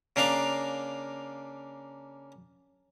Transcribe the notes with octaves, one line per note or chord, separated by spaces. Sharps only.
C#3 A#3 D4 F5 A#5